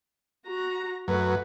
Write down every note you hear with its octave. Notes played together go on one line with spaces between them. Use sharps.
F#4 A#5
F#2 A3 B4